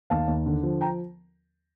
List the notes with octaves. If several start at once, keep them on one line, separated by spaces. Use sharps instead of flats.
D#2 F5 A5
D#2
D3
F3
G5 A#5